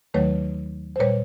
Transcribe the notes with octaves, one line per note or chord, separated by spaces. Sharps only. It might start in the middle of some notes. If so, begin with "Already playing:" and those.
D#2 D#3 F#3 A3 B4 C#5
C5
A#2 G3 B4 C#5